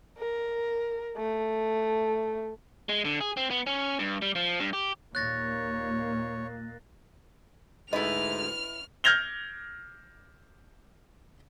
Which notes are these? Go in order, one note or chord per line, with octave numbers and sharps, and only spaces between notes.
A#4
A3
G#3
D3
G#4
C4
B3
C#4
G2
G3
F3
G2
G4
D#2 A#2 A#3 C#5 F#6 A6 A#6
D2 G#2 E4 B4 D#5 F6
F6 G6 G#6 A#6 F7 G7